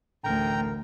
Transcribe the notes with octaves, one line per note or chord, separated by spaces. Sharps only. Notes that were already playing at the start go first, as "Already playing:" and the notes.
A1 D2 A#4 G5 A#5